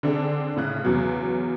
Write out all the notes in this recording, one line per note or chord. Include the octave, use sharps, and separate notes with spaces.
D3 C4 D4 G#4 A4
A2 C#3 F#6
E2 C#3 F#3 B3